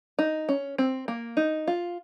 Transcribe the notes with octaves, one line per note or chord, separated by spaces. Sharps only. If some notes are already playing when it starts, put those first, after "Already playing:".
D#4
C#4
C4
A#3
D#4
F4